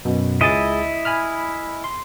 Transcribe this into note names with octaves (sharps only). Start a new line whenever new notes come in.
F#2 B2
C#2 E4 G#4 D#5 A6
G#5 B5 F6
C6